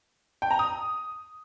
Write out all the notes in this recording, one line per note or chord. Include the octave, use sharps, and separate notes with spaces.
G5
A#5
D#6